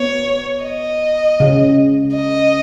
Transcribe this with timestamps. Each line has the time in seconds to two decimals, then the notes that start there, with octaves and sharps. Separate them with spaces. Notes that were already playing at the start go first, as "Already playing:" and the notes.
Already playing: B3 C#5
0.64 D#5
1.40 C#3
2.15 D#5